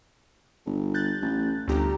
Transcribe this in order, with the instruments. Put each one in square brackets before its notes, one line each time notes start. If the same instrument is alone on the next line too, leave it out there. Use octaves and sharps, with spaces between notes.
[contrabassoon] G1
[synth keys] F#6 G6 A6
[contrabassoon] A1
[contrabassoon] G1 [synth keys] D2 G4 A#5